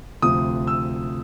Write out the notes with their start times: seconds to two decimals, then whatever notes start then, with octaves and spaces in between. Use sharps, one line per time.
0.22 D2 C3 F3 D#6
0.67 E6